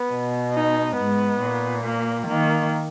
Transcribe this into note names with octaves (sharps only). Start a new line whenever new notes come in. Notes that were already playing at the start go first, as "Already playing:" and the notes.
Already playing: B3
B2
D#4
G#2 B3
A#2
A#3
D#3 A#3